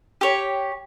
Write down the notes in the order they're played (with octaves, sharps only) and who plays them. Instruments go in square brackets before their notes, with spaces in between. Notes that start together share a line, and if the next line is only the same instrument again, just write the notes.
[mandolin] G4 C#5